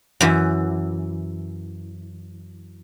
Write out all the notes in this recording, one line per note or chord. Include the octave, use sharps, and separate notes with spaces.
F#2 E3